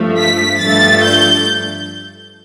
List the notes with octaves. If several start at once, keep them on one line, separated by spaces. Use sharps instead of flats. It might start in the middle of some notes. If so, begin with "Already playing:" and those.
Already playing: G2 F3 A3
B6
G2 F3 A3 A6
G6